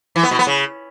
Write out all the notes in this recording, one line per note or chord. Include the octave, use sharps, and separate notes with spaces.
E3
B3
B2
B3
C#3